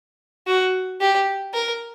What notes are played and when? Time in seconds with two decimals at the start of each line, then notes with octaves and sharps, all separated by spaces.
0.47 F#4
1.01 G4
1.54 A#4